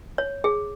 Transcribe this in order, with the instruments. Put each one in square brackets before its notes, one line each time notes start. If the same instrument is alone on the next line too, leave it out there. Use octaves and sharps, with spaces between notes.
[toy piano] C#5
G#4